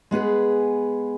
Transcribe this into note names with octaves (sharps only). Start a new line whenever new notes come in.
G#3 B3 G#4 B4